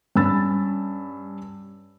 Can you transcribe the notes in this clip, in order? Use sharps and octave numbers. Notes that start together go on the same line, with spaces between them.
G2 C#4 B5 E6 A6